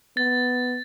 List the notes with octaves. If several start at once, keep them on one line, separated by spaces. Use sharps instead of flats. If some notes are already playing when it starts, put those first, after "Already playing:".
B3 A6